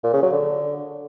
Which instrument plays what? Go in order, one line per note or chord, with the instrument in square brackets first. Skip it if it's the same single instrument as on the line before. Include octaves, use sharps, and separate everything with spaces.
[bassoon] A#2
C#3
F#3
D3